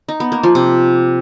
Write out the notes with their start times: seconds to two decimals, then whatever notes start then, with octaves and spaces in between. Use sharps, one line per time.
0.09 D#4
0.20 B3
0.32 A#3
0.43 F3
0.55 C3